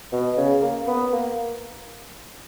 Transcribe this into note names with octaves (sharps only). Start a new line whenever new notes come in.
B2
C#3
A#3
B3
A#3